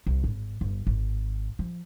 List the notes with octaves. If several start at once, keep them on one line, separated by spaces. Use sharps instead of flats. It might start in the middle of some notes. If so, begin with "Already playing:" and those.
C2
G#1
G1
G#1
F3